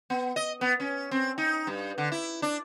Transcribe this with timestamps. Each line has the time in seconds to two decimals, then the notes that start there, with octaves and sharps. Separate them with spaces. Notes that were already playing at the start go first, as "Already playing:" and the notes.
0.10 B3
0.36 D#5
0.61 B3
0.80 C#4
1.11 C4
1.38 D#4
1.67 G2
1.98 D3
2.12 E4
2.42 D4